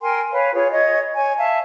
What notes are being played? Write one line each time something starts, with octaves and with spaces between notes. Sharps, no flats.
A#4 G5 G#5 C6
B4 C#5 F5 G#5
F4 G#4 C#5
C#5 D#5 G#6
C#5 G#5
E5 F5 A5